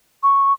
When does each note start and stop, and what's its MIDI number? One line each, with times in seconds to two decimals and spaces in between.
0.23 0.53 85